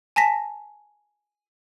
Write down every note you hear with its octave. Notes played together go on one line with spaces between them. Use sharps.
G#5 A5 A#6 B6